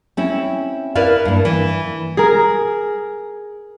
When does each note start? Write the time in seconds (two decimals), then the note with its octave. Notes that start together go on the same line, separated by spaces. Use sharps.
0.17 C4 C#4 E4
0.95 E4 A#4 B4 D5 F5
1.25 G2 A#3
1.45 E3
2.17 G#4 A#4